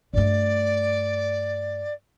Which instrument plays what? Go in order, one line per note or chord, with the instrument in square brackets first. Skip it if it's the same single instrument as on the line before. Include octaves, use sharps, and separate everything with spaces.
[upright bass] G2 A3 [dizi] D5